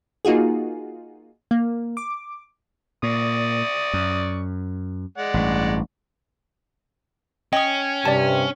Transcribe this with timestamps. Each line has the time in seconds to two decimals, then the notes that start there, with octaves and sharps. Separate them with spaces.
0.25 A#3 D#4 F4 F#4 G#4
1.51 A#3
1.97 D6
3.03 A#2 D5 C#6 D#6
3.93 F#2
5.18 G#3 D5 F#5
5.34 A1 G2
7.53 C#4 D#5 G5 D#6
8.05 G2 C3 D5 A5